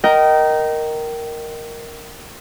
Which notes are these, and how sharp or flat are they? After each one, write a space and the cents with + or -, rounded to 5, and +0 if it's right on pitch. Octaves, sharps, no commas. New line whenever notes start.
A#4 +0 D#5 +0 G5 -25